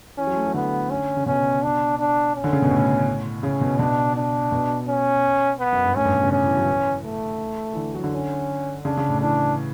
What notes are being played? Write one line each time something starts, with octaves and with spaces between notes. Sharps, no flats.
E3 C#4
F#3
A3
F#3
D3 B3
C#4
C#3
B2 C#4
D4
D4
C#4
D3
C#3
B2
A2
C#3 C#4
B2
B2 D4
D4
B2
C#4
B3
F#2
G2
A2 C#4
G2
B2
C#3
D3 C#4
E3
F#3
E3
A3
E3
D3
F#3
D3
C#4
C#3 D4
C#3
A2
E3 D4